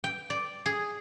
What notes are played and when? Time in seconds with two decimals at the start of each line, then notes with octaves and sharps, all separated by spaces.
0.04 G5
0.30 D5
0.66 G#4